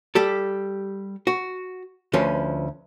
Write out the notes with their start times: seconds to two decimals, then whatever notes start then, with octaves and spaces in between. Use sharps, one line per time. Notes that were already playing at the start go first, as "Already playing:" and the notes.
0.15 G3 G4 A4
1.27 F#4
2.13 D2 F3 C#4 B4